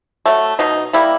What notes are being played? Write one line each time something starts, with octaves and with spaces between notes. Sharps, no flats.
F#3 A3
B2 D#4
G3 A#3 E4